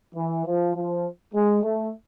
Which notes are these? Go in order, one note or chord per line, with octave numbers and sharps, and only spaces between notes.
E3
F3
F3
G#3
A3